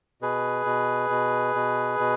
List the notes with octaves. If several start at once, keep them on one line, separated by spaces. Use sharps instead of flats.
B2 G#4 B4
B2
B2
B2
B2